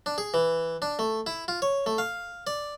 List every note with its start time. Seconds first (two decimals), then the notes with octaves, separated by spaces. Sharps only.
0.06 D4
0.18 G#4
0.34 E3
0.82 D4
0.99 A3
1.27 E4
1.48 F4
1.62 C#5
1.86 A3
1.98 F5
2.47 D5